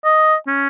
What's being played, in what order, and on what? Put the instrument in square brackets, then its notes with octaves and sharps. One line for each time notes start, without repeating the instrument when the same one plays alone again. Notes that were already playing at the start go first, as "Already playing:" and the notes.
[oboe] D#5
C#4